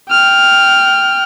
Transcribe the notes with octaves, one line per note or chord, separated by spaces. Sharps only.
G5 F6